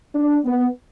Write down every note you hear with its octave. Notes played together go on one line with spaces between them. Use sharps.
D4
B3